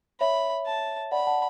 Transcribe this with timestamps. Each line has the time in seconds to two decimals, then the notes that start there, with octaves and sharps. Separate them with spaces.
0.20 C#5 E5 B5
0.66 A5
1.12 D5 F#5 B5
1.27 F#5 A5